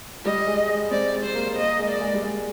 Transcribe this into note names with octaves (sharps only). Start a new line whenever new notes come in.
G3 D#5
G#3
G#3
C4 D5
G#3
C5
A#3
A#3 D#5
G#3
D5
G#3
G3
G#3